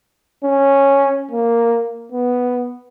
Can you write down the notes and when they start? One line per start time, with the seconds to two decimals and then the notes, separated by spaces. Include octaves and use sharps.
0.44 C#4
1.31 A#3
2.12 B3